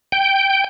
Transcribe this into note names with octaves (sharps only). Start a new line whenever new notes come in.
G5